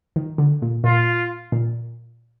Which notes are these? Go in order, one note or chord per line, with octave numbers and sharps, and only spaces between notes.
D#3
D3
A#2
A#2 F4
A#2